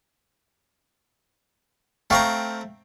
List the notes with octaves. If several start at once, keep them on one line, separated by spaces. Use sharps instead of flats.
A3 C4 F5 G5 A#5 C#6